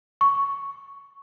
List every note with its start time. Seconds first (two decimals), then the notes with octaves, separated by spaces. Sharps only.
0.21 C#6